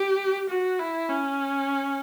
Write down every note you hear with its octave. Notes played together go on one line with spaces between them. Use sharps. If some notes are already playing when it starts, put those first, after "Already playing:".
Already playing: G4
F#4
E4
C#4